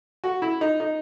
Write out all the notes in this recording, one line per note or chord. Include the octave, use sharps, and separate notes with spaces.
F#4
E4
D#4
D#4